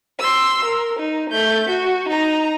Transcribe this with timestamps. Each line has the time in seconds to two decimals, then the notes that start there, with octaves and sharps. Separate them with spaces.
0.19 C6 E6
0.65 A#4
0.99 D#4
1.30 A3 G6
1.69 F#4
2.09 D#4 A#5